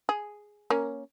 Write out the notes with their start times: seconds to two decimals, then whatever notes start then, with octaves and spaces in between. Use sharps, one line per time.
0.09 G#4
0.70 A#3 C#4